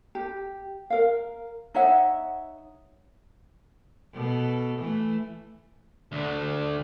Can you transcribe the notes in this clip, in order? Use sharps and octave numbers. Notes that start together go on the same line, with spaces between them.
G4
A#4 F5
D#4 C#5 E5 F#5
B2 A4
E3 A3
D2 D3